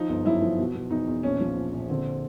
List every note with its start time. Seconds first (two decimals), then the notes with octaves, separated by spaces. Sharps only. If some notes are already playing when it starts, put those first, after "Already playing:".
Already playing: F3 D#4
0.09 G1
0.25 F#2 E4
0.42 F3
0.58 B2
0.75 B2
0.91 E2 D#4
1.08 E2
1.23 A#1 C#4
1.40 F3
1.56 A#1
1.73 A#1
1.90 D3 C4